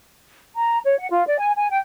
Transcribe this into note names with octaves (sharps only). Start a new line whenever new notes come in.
A#5
C#5
F#5
F4
D5
G#5
G#5
G5